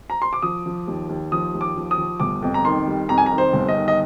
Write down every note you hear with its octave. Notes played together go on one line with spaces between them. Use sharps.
A#5
C6
D6
F3 D#6
F3
D#2
D#2
F3 D#6
D#2
D6
F3
D#6
F3
G1 D6
F2
A#5
D#3 C6
G3
F2 A#5
G#5
D#3 A#5
C5
G1
D#5
D#3
D#5